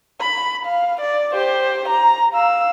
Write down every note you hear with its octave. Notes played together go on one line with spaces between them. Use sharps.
B5
F5
D5
G4 C5
A#5
F5 E6